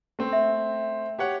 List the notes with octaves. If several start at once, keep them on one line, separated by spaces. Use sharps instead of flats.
A3 C4
E5
G4 C#5 F#5